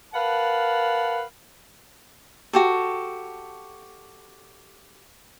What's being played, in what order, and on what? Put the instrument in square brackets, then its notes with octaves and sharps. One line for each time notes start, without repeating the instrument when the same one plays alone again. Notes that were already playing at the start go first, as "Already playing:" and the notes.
[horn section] A#4 B4 F5 F#5 A5
[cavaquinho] F#4 G4 A4